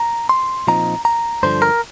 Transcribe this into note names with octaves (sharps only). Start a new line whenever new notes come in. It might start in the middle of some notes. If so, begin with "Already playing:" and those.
Already playing: A#5
C6
A#2 F3 C4 D#4 A#5
A#5
G2 D3 F3 C5
A#4